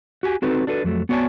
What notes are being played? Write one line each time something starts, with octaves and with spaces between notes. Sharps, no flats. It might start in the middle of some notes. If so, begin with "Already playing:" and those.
F#4 G4 G#5
C4 D#4 F#4 A4 B4
D4 F#4 A4 B4
F2 F#3 A3
B3 F#4 C#5 D5 G#5 A5